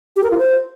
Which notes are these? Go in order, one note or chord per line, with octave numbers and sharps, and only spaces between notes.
G4
A#4
F4
C5